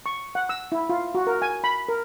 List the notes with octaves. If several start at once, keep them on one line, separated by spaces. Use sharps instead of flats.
C#6
F#5
E6
E4
F4
F#4
A#4
G#5
B5
A#4